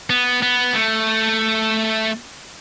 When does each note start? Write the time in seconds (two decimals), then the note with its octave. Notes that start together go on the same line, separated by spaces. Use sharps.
0.10 B3
0.42 B3
0.75 A3